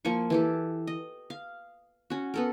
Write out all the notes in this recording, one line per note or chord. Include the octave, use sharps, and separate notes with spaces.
F3 A#3 G#5 C#6
E3 G4 A4
D#5
F5
C#4 F#4
B3 A4 A#4